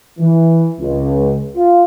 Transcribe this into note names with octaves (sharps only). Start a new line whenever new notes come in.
E3
C#2
F4